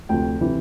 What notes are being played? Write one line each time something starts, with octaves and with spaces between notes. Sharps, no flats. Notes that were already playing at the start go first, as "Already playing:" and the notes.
D2 C3 F3 G5
C3 E3